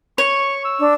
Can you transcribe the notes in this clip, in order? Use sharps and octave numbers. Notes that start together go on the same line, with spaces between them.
C#5 C#6
E6
D4